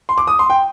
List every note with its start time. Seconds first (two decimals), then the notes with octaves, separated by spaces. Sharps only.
0.09 C6
0.18 D6
0.27 D#6
0.39 C6
0.50 G5